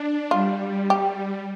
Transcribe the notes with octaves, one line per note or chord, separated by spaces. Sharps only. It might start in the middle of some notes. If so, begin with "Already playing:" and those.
Already playing: D4
G3 F4
G4